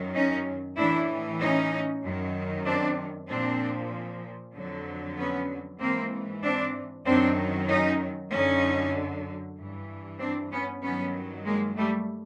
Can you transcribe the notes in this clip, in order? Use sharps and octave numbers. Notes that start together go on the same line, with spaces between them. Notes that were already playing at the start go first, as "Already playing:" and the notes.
Already playing: F#2 D#3 F#3
C#4 D#4
A2 E3 D4 E4
C#4 D#4
F#2 D#3 F#3
C4 D4
A#2 F3 C4 D4
F2 D3 F#3
B3 C#4
G#2 E3 A#3 C4
C4 D4
F#2 D#3 F#3 C4 D4
C#4 D#4
F#2 D3 F#3 C#4 D#4
G2 E3
C4 D4
B3 C#4
G2 D#3 F#3 B3 C#4
G#3 A#3
G3 A3